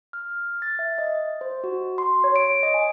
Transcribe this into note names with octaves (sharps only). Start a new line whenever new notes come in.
F6
A6
E5
D#5
C5
F#4
C6
C#5
D7
D#5
G#5